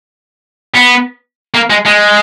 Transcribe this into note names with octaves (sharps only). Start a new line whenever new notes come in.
B3
A#3
G#3
G#3